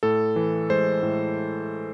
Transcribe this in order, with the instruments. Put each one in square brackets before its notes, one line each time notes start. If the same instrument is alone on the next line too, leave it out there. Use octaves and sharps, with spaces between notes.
[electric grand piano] A2 A4
E3
G#3 C5
A2